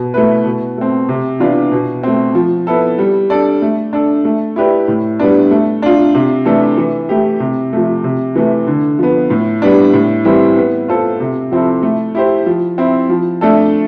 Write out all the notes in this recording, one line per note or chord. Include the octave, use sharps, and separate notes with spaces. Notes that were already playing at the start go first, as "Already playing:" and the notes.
Already playing: B2
A3 E4 B4
B2
A3 C4
C3
E3 B3 D4 F4
B2
A3 C4
F3
B3 E4 A4
G3
D4 A4 D5
A3
D4 A4
A3
E4 G4 B4 D5
A2
G3 B3 D4
A3
D4 F4
C3
E3 A3 D4 A4
E3
A3 E4 G4
C3
F3 A3
C3
E3 A3
D3
F3 B3
A2
G3 B3 D4
A2
E3 G3 C4 E4
B3
F4 A4 C5
C3
F3 C4 E4 A4
A3
E4 G4 C5
F3
C4 E4
F3
A3 D4 A4